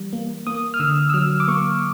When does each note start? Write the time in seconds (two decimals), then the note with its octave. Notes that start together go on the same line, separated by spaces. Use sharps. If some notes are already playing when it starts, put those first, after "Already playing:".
Already playing: E3 G3
0.13 A#3
0.47 A#3 D#6
0.74 F6
0.80 D3 E6
1.10 E6
1.14 F#3 F6
1.40 D6
1.48 A#3 C#6